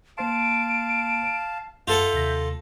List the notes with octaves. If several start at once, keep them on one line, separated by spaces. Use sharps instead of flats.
A#3 C5 F5 A5 C6 D7
F#2 F4 A4 E5 F#5 G6
D#2 C3 A#6